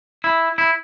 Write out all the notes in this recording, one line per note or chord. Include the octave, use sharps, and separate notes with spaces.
E4
E4